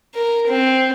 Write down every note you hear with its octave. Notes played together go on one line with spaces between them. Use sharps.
A#4
C4